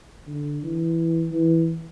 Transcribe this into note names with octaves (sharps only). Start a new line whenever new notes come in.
D3
E3
E3